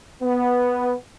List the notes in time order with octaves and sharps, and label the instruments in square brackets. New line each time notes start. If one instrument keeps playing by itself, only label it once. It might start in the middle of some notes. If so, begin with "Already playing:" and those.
[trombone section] B3